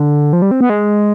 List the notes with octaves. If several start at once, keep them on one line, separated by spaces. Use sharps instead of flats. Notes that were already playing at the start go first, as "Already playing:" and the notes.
Already playing: D3
F3
G3
C4
B3
G#3